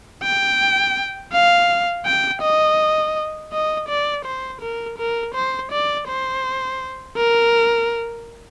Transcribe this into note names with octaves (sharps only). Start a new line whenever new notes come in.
G5
F5
G5
D#5
D#5
D5
C5
A#4
A#4
C5
D5
C5
A#4